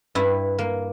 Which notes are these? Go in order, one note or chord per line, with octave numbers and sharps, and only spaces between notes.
G2 E4
A#3